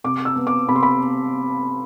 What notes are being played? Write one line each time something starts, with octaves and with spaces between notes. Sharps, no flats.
C3 D6
E6
B3
D6
C3 B5
C6
B5